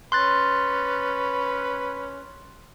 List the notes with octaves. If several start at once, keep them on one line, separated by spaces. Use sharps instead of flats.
C#4 B4 C6 F#6 A6